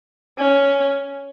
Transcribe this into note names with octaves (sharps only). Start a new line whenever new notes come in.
C#4